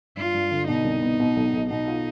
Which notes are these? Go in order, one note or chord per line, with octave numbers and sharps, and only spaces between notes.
G2 F4
G2
D3
B2 D#4
C2
B3
B2
B1
B1
B2 D#4
F4